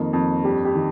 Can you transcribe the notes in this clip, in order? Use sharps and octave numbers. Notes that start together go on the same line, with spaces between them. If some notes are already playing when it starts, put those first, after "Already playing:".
Already playing: F2 D#3 A#3
F2
G2 G4
G4
D#3